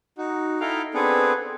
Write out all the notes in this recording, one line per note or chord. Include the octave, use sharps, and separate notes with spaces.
D#4 F#4
D#4 E4 A4 F5 G5 A#5
B3 C4 D4 G#4 A4 B4